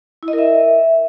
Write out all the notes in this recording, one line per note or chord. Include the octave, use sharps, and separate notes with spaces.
E4
D#5
A#4
E5